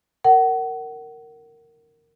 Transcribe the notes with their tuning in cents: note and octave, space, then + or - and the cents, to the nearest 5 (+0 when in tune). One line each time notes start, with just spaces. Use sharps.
A#4 -15 F#5 +30